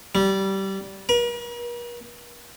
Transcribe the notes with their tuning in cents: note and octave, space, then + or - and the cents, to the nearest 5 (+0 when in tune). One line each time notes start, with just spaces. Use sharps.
G3 -20
A#4 +45